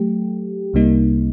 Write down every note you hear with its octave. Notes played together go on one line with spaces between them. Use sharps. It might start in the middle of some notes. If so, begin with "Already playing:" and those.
Already playing: F#3 A3 G4
C2 C3 G3 A#3 D#4